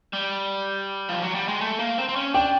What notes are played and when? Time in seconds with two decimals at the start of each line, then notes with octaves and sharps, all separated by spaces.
0.13 G3
1.09 F3
1.23 F#3
1.35 G3
1.48 G#3
1.61 A3
1.79 A#3
1.98 C4
2.09 C4
2.16 C#4
2.34 D4 G5